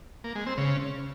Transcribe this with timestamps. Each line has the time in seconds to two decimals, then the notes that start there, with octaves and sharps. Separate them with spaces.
0.24 A#3
0.35 G#3
0.47 C4
0.58 C#3